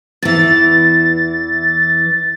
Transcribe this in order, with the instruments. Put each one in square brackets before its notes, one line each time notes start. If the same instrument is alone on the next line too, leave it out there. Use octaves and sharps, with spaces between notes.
[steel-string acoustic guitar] E2 E3 [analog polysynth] A6